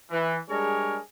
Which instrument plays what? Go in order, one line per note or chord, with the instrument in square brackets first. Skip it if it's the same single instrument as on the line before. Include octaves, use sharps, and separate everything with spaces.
[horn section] E3
G3 G#3 D4 G#4 A#4 C#5